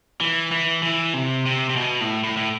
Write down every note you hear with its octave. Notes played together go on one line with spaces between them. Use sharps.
E3
E3
E3
C3
C3
C3
B2
A2
A2
A2